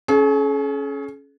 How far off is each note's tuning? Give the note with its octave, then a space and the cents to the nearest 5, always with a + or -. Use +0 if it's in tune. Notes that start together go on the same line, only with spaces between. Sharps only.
C#4 +0 G#4 +45